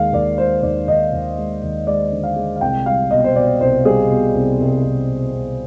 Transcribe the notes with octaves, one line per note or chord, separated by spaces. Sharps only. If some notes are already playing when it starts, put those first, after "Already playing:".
Already playing: D#2 G#3 F5
D#2 D5
G#3 C5
D#2 D5
D#2 D#5
D#2
G#3
D#2
G#3 D5
D3
F5
G#3
F5
C2 G5
G3 F5
B2 D#5
C5
B2 D5
C2 C5
G3 G#4
B2
C2
C2
C2
B2
C2